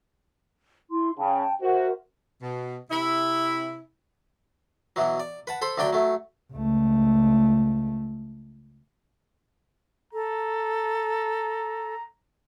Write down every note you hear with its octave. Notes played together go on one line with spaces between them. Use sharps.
E4 C6
C#3 G5 A5
F#4 A#4 C5 E5
B2
C3 E4
B2 E3 F#3
D5
B4 F#5 A5
A4 C5 B5 C6
D2 F#3 D4 D5 G5
F#3 A3
C#2 A3
A4 A#5